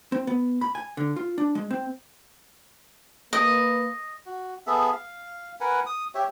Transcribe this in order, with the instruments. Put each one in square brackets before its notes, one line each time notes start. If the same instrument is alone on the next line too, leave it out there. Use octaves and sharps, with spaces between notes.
[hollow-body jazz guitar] C4
B3
B5
G#5
D3
F4
D4
G#3
C4
[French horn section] A#3 B4 [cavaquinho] D#5
[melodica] F#4
B3 G#4 A4 E5
F5
A#4 B4 F#5 G#5
D#6
G4 C#5 E5